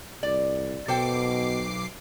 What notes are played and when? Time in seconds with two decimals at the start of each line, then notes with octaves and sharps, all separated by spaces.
0.23 C2 D5
0.88 B1 B2 A4 C5 G5 D6 C7